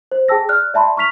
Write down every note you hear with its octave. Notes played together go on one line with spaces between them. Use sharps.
C5
G#4 G5 A5 E6 A#6
D5 F6 F#6
D5 E5 A5 B5 C6
A#5 C#6 F6 B6 F7